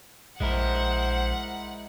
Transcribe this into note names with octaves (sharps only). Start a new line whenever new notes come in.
A#1 G#3 E4 A#4 C5 F#5